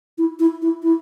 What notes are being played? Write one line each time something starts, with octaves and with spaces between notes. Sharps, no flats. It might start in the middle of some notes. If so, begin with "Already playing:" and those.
E4
E4
E4
E4